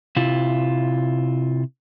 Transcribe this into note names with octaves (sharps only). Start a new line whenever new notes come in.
C3 E4 F4